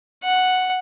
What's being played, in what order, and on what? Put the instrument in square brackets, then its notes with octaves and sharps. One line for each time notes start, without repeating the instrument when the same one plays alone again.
[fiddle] F#5